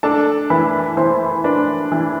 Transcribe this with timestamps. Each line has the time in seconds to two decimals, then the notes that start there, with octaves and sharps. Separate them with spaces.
0.03 D4 A4 A5
0.50 E3 B4 B5
0.97 E3 C5 C6
1.44 D4 B4 B5
1.92 E3